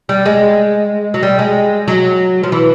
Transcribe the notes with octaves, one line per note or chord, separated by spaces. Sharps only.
G3
G#3
F#3
G3
G#3
F#3
F3
E3